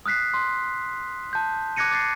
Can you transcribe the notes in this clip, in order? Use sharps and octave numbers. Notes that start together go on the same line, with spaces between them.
D#6 F6 F#6 B6 C7
C6
A5 G6
D6 F#6 G#6 A#6 C#7 D#7
D6 A6 C7